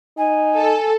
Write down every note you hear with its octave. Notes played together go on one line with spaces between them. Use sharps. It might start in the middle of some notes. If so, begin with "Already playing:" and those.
D#4 G#5
A4